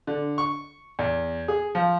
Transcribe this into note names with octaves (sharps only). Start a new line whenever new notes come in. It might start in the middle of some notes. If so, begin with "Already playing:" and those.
D3
C#6
E2
G#4
F3